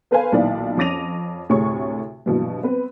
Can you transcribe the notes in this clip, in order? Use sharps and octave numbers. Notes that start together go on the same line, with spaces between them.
B3 A4 B4 C5 F5 G#5
B1 A#2 D#3 E4 D5 F5
F2 C#4 D6 A#6 D#7 F7
D2 A2 C3 G#4 C#5 C#6
A#1 G2 B2 E3 F#3
B3 C4 B4